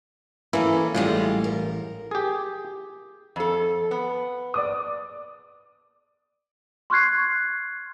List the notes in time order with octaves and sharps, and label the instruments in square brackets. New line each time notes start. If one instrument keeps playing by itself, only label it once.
[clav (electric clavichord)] E3 A#3 E4 [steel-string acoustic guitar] C#4 A4
[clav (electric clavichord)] A1 A2 [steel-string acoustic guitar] G3 G#3 F4
[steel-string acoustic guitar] A#4
[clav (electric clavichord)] G4 G#4
[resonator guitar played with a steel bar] F2 A4
B3
[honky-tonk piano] D5 D6 D#6
[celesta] C6 C#6 F6 F#6 G#6 C7